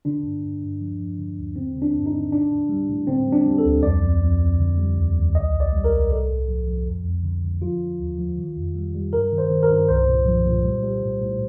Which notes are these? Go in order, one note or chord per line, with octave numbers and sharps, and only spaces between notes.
D3 D4
G2
G2
G2
F3
F3
D3
D#2
D3 C4
D3
D4
G2
D#4
D3
A2 D4
A2
G3
A2
D3 C4
G3
D4
G3
A4
D2
F2 D5
F2
F2
F2
D3
G3
D#2
D#2
C2 D#5
C2
D5
G3
A#4
C2
A2 A4
A2
F3
F3
F2
F2
D3
D3
F3 F4
F3
D#2
F3
D#3
F2
G3
G3
G2 A#4
D#3
C5
D#3
A#4
G2
C2 C5
A#2
F3
A#2
G3
G3
A2
A2